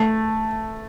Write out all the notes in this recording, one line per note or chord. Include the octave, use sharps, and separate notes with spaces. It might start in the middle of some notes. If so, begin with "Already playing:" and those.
Already playing: A3